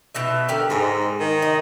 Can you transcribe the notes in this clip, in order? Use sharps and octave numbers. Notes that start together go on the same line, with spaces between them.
B2 D#4 E5
D3 G4 A#4
G#2 G#5 A#5
D#3
D#5